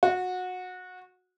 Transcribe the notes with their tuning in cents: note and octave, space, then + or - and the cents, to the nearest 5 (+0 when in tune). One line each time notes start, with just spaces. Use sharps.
F#4 -20